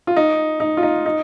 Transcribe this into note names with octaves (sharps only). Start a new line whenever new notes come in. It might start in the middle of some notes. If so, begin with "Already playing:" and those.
F4
D#4
D#4
F4
D#4
D#4